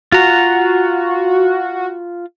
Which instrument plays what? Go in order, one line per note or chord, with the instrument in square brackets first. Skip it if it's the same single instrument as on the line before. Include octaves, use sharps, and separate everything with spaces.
[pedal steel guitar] F4 A#5 [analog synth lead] F#4